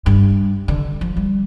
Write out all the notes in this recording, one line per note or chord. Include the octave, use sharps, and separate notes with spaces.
G2
D3
F3
G3